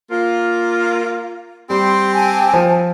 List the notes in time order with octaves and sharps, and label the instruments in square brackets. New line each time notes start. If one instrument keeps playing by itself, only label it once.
[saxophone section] A#3 F4
[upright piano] G3 [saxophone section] C4 G4 [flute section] C6
[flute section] G#5 A5
[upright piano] F3